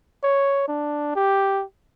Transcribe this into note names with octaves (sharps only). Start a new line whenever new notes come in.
C#5
D4
G4